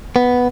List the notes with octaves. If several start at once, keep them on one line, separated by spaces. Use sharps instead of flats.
B3